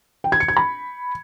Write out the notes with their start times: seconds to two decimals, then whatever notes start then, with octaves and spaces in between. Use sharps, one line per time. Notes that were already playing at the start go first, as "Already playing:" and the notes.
0.24 G5
0.32 G#6
0.40 C#7
0.48 G#6
0.57 B5